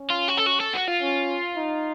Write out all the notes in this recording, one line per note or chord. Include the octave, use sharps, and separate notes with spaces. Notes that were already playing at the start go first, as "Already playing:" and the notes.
Already playing: C#4
F4
F#4
A4
F#4
A4
F#4
F4
C#4
D#4